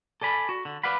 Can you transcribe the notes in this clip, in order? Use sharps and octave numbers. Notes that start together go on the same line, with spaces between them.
A4 D5 G#5 B5
F#4
D3
B4 D5 F5 F#5 B5